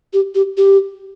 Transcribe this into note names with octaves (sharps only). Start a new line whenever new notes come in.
G4
G4
G4